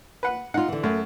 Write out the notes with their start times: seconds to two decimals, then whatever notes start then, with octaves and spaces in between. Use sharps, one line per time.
0.23 B4 F#5
0.54 D#4 F4 F#5
0.68 D3 E3
0.84 F#2 A3